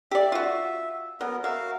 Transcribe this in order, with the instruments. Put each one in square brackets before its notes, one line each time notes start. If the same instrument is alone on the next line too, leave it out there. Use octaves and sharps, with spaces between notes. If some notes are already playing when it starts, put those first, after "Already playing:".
[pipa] G4 D5 [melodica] E5
[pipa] F4 F#4
[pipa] F#3 [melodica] B3 A#4
[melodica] F#4 A#4 F5 [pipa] E5